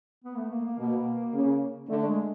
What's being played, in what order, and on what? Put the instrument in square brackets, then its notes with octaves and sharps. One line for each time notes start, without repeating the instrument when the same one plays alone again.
[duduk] B3
A3
A#3
A#3
[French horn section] B2 [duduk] A#3
[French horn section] C#3
[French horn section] D3 [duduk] A3
[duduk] G#3